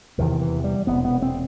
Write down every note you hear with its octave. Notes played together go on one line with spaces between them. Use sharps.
E1 E2 C3 D#3
E3
G3
E1 E2 C3 B3
B3
C4